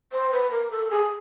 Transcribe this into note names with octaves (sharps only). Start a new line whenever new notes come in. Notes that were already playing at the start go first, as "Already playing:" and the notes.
C5
B4
A#4
A4
G#4